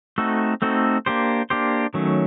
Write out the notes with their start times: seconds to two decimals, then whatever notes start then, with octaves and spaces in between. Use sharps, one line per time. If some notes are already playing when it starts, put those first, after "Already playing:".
0.18 A3 C4 D#4 F#4 A4
0.62 A3 C4 D#4 F#4 A4
1.06 A#3 D4 G4 C5
1.50 A#3 D4 G4 C5
1.94 D#3 F#3 A3 C#4